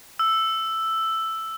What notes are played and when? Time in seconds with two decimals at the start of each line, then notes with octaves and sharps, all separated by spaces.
0.19 E6